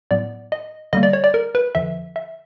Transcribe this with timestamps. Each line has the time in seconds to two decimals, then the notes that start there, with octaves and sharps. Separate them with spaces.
0.11 A2 F#3 B3 D5
0.52 D#5
0.93 D3 G3 A#3 D#5
1.03 D5
1.13 C#5
1.24 D5
1.34 A#4
1.55 B4
1.75 F2 D3 F3 E5
2.16 E5